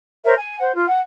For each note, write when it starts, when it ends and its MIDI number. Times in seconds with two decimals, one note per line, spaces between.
0.23 0.32 70
0.23 0.32 72
0.23 0.32 73
0.23 0.32 76
0.37 0.58 80
0.59 0.70 72
0.59 0.70 78
0.73 0.84 65
0.87 0.99 78